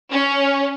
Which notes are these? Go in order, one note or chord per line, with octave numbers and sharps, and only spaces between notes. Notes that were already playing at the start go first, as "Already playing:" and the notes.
C#4